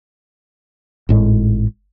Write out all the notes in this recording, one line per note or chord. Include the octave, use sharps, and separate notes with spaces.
G#1 A2 G#3